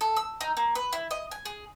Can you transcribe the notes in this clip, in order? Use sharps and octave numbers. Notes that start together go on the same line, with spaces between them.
A4
E6
D#4
A#3
B4
E4
D#5
G#5
G#4